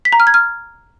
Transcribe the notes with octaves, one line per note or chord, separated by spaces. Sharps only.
B6
A#5
F6
G#6
F6